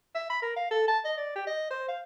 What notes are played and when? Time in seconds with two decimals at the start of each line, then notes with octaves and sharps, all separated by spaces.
0.15 E5
0.30 B5
0.42 A#4
0.56 F5
0.71 A4
0.88 A5
1.05 D#5
1.17 D5
1.35 G4
1.47 D#5
1.71 C5
1.88 F5